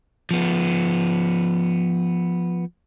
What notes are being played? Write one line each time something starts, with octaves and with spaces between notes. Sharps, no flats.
F3 B3